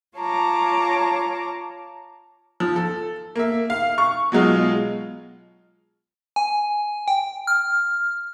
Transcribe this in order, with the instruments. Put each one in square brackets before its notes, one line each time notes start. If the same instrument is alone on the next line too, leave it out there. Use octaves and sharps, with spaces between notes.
[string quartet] F4 C#5 A5 A#5 D6
[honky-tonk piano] F3
A4
A#3 E5
F5
C#6
B2 F#3 G#3 F4
[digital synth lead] G#5
G5
F6